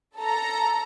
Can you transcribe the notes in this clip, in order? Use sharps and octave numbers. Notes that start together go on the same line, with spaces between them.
A4 A#5